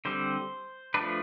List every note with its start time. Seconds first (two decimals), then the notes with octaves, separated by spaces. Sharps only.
0.05 D3 G3 C4 C5
0.94 F3 A3 D4 B4